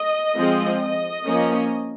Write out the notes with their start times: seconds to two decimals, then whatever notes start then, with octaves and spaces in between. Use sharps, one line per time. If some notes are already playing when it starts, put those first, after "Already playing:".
Already playing: D#5
0.37 F3 G#3 C4
0.82 D#5
1.25 F3 A#3 C#4